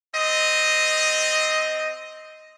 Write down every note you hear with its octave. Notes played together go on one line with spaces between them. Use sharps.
C4 D#5